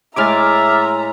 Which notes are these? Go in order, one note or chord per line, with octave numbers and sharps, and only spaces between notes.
A2 G#3 E5 G#5 A#5 D6 F6 A6